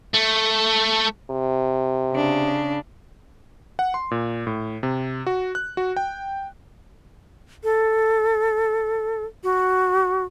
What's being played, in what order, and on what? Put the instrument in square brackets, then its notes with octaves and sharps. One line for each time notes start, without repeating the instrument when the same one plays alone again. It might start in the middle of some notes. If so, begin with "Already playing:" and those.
[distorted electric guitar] A3
[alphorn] C3
[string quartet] C#3 D4
[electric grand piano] F#5
C6
A#2
A2
C3
F#4
F#6
F#4
G5
[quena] A4
F#4